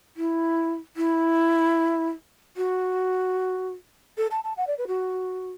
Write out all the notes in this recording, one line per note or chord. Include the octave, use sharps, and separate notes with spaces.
E4
E4
F#4
A4
A5
A5
F#5
D5
B4
F#4